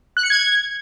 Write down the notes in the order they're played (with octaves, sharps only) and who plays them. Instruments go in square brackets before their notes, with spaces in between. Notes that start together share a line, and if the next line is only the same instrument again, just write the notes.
[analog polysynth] F#6
C#7
G#6